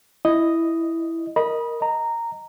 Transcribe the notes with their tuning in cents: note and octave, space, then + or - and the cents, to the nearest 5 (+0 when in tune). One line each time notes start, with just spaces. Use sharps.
E4 +0 D#5 +0
A#4 +0 D#5 +0 B5 -30
D#5 +0 A#5 -10